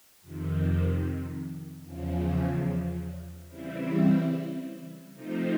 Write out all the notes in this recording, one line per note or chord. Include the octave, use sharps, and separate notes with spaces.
F2 C3 D#3
E2 C#3 F3
C#3 E3 G3 C4 E4
C3 F3 A3 C4 D#4